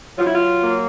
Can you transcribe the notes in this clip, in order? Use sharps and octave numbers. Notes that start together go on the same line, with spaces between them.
F#3 F4
E4
F4
A#3